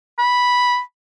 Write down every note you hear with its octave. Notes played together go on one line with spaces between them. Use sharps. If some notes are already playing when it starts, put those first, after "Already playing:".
B5